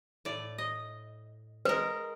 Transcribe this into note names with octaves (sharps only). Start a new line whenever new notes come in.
A2 D5
D#5
G#3 A#4 B4